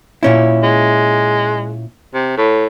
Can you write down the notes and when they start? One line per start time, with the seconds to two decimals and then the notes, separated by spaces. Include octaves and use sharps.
0.23 A#2 C#4 E4
0.63 G#3
2.14 C3
2.37 A2